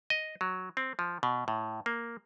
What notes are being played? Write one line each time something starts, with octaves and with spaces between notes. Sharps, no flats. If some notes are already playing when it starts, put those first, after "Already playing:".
D#5
F#3
C4
F3
B2
A2
A#3